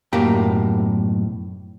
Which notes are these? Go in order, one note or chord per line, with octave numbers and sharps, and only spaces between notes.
B1 F#2 A2 A#3 G4 A#5